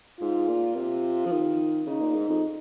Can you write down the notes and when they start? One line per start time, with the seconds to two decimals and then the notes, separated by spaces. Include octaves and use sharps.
0.21 G#2 F4
0.48 A#2
0.76 C3
1.25 F3
1.32 D#3
1.87 C#3 D#4
2.01 A#2
2.14 G#2
2.29 F2